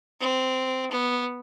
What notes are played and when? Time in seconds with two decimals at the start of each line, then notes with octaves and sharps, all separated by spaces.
0.21 C4
0.91 B3